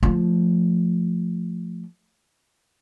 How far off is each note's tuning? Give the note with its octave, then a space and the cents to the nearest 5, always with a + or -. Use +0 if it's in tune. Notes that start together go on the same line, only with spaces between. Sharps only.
F3 +0 A3 +5